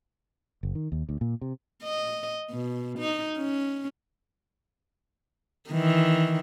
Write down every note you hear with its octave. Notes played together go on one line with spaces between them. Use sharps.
F#1
D#3
D#2
D2
A#2
C3
D#5
B2
D#4
C#4
D#3 E3